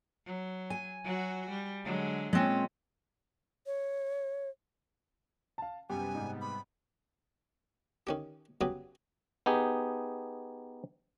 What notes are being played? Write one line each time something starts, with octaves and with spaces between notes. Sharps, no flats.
F#3
G#5
F#3 F#4
G3
D3 F#3 G#3
A#2 G#3 C4 C#4
C#5
F5 A5
F#2 C3 G3 B3 G4 G#5
G#2
B5
D#3 C#4 G4
C#3 F#3 B3 G4 G#4
B3 D#4 G4 G#4